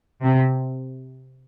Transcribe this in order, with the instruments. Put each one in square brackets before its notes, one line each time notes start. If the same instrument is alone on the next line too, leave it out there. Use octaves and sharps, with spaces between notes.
[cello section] C3